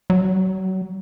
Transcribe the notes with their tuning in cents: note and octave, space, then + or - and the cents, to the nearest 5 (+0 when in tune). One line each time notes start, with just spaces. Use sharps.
F#3 +30